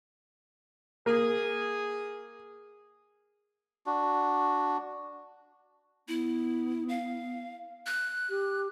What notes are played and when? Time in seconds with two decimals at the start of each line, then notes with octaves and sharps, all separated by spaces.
1.06 A#3 G#4
3.86 D4 F#4
6.08 B3 E4
6.89 F5
7.86 F#6
8.29 G4